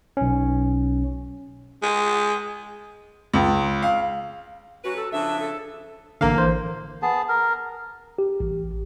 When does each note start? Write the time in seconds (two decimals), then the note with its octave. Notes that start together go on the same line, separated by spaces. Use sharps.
0.17 B1 C#4
1.82 G#3
3.34 C#2
3.82 F5
4.84 F#3 C#4 F#4 B4
4.96 A4
5.13 C#3 F3 D4 E5
5.40 A4
6.21 A1 D3 A#3 F5
6.35 E3 C5
7.02 B3 G#4 A5
7.29 A#4
8.18 G4
8.40 A1